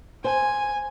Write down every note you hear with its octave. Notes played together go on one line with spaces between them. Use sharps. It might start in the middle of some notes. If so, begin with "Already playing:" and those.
C5 G#5